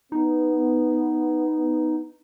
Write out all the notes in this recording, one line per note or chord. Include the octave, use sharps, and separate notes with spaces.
B3 D#4